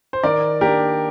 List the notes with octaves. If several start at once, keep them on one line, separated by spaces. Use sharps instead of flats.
C5
D#3 A#4 D5
A#3 D4 G4 A#4